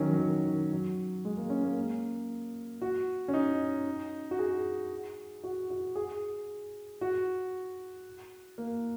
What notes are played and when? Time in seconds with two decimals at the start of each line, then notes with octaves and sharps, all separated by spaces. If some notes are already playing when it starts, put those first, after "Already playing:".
Already playing: D#3 F#3 C#4
0.13 F#3
0.19 D#3
0.45 D#3
0.72 F#3
1.25 G#3
1.37 A#3
1.50 C#4
1.63 A#3
2.82 F#4
3.28 C#4
3.34 D#4
4.31 F#4
4.39 G#4
5.44 F#4
5.70 F#4
5.96 G#4
7.01 F#4
8.58 A#3